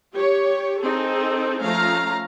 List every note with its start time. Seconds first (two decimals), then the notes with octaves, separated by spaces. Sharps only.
0.13 G4 C#5
0.81 C4 D#4 G#4 A4
1.61 F3 A3 C#4 F5 A#5